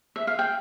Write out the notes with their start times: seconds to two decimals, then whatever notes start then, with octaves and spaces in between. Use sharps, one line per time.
0.16 E5
0.27 F5
0.39 G5